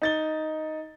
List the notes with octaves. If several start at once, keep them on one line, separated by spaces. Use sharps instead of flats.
D#4 A6 G7